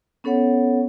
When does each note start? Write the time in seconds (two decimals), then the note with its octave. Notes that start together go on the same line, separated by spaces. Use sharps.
0.24 B3 C#4 A4 C#5 F#5